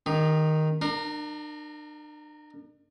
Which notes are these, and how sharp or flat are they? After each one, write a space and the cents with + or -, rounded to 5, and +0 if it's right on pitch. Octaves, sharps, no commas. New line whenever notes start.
D#3 +0 G4 +45
D4 +40 A#4 -15